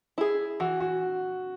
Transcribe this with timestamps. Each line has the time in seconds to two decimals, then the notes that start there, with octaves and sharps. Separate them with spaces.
0.18 E4 G#4
0.60 E3 F#4
0.80 F#4